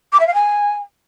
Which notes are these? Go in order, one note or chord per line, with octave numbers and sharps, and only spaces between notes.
D6
E5
F5
G#5